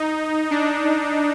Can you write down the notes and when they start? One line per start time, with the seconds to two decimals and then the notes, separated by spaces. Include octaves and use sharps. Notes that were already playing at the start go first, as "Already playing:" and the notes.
Already playing: D#4
0.51 D4